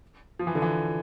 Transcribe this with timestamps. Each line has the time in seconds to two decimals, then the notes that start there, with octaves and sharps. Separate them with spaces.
0.39 F3
0.47 E3
0.55 D3
0.62 E3